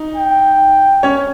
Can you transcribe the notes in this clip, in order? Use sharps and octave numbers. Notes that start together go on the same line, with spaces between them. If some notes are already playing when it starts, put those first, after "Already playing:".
Already playing: D#4
G5
C#4 C#5